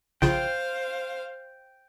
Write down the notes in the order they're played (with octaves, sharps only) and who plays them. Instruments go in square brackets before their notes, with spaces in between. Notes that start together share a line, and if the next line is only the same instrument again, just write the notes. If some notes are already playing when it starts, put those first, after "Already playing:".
[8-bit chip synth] A#1 C#3 F4 [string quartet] C5 F5 [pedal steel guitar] G5